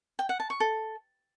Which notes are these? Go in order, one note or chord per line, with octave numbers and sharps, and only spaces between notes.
G5
F#5
A5
C#6
A4